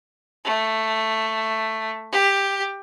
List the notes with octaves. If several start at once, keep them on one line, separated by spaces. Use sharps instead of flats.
A3
G4